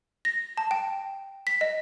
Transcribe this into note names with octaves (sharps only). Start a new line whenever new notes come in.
A#6
A5
G5
B6
D#5